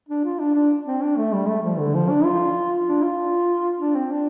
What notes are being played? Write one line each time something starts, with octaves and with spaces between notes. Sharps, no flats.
D4
F4
D4
D4
C4
D4
A3
G3
A3
F3
D3
F3
D4
F4
D4
F4
D4
C4
D4